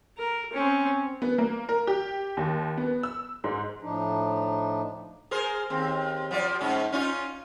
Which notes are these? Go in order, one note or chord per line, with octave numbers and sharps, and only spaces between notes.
A#4
C4 C#4
B3
A#3
A#4
G4
D#2
B3
E6
G#2
A2 F3 D4 D#4
G#4 A#4 C5
D#2 C4
F3 F#3 D5
G#2 C#4
C#4 D#4 F4